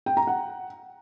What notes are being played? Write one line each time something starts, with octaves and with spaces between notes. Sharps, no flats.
G5
A#5
F#5